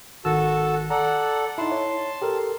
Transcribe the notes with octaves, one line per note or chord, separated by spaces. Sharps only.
G#1 D#3 F#4 A4 A5 E6
A4 D5 F#5 A#5
D#4 E4 A5 C6
C#5
G4 A4 A#4